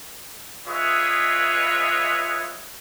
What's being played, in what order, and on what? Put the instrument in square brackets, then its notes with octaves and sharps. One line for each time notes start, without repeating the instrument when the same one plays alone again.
[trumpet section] F4 G#4 B4 C#5 D#5 E5